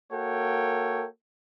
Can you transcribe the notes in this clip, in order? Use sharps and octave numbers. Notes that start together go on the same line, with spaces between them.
A#3 F#4 A4 A#4 C#5 G5